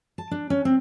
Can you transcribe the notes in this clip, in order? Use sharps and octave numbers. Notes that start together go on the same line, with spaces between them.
A5
D4
C#4
C4